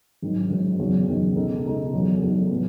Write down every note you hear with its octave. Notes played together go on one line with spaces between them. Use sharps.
G#1 G#2 D#3 F#3
G#1 G#2 D#3 F#3
F#1 E2 D#3 F#3
F#1 E2 D#3 F#3
C#2 B2 G#3 D#4 A4
C#2 B2 G#3 D#4 A4
E2 D#3 F#3 A3
E2 D#3 F#3 A3
A2 F#3 B3